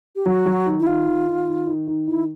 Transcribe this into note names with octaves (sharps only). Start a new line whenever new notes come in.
G4
F#3 F#4
F#3
D#3
E4
D#3 F4
D#3
D#3
D#3
D#3
D#3
D#3 E4